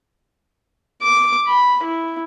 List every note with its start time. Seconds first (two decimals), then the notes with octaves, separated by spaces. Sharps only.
1.03 D6
1.47 B5
1.83 E4